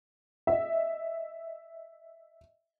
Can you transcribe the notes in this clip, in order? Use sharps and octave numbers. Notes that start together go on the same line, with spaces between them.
D#5 E5